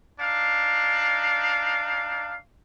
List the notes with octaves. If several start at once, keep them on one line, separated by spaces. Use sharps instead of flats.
D4 D#4 F5